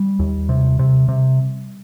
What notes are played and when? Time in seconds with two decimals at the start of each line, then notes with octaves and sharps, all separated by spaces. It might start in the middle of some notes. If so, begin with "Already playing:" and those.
Already playing: G3
0.19 D#2
0.49 C3
0.79 C3
1.09 C3